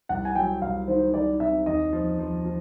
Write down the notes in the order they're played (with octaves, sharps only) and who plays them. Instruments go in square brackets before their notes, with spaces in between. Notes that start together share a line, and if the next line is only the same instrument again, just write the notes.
[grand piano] C2 [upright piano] F#5
[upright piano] G#5
[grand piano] F#3 [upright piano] G5
[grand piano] C2 [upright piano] F5
[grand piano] D#3 [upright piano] C5
[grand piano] D#3 [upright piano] D5
[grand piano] C3 [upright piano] E5
[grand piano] D#2 [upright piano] D#5
[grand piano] F3
F3
F3